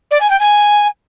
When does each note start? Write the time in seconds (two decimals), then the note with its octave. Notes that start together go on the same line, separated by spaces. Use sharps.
0.11 D5
0.21 G#5
0.30 G5
0.40 G#5